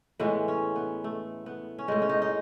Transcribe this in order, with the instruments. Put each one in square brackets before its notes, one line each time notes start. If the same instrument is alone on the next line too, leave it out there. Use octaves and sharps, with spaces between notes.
[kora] A2 E3 G#3 B3
C#4
B3
A3
B3
C#4
A2 G#3 D#4
C#4
D#4
D#4